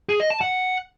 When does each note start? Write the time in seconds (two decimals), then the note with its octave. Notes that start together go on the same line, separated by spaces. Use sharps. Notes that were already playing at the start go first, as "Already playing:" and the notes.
0.09 G#4
0.20 D#5
0.30 A5
0.41 F#5